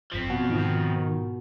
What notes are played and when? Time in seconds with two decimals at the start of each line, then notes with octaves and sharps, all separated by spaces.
0.13 G#1 F#2 F3 C4 B6
0.30 B2 F#5
0.50 G#2 D#3 F4